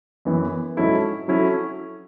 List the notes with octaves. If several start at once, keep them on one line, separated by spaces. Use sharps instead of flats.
F#2 E3 B3
G#2 F#3 C#4 E4 A4
F#3 C#4 E4 A4